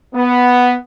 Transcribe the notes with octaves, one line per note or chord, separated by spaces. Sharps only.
B3